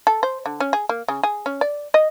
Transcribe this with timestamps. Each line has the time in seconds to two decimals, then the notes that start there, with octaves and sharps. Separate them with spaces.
0.07 A4
0.23 C5
0.46 D3
0.60 C#4
0.73 G#4
0.89 A#3
1.08 C#3
1.23 G#4
1.46 C#4
1.61 D5
1.94 D#5